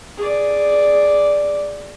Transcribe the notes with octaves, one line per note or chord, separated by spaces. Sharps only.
G#4 D5